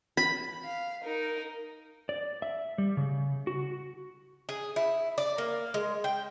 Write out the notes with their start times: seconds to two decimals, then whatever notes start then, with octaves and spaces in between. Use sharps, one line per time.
0.17 B5
0.64 F5
1.04 D#4 A#4
2.09 D5
2.42 E5
2.78 G3
2.97 C#3
3.47 F#4
4.49 G#4
4.76 E4
5.18 D5
5.38 A#3
5.74 G#3
6.04 G5